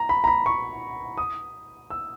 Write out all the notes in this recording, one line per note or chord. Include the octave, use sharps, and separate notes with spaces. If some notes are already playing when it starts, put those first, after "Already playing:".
Already playing: A#5
B5
A#5
B5
C#6
D#6
E6